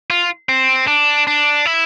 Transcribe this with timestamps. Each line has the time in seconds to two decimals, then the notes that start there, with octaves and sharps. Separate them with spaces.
0.10 F4
0.49 C4
0.87 D4
1.27 D4
1.66 E4